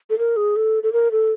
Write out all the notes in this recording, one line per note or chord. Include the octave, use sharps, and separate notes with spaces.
A4
A#4
G#4
A4
A4
A#4
A4